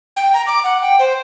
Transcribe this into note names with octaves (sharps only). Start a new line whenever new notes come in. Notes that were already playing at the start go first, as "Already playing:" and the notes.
G5
A#5
D6
F#5
G5
C5